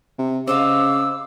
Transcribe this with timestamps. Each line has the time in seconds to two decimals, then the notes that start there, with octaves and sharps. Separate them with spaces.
0.19 C3
0.47 C#3 C5 D#5 F5 D6 E6